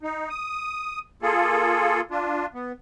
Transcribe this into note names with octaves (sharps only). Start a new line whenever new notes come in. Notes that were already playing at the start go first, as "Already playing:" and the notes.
D#4
D#6
A#3 F4 G#4 A4
D4 F4
B3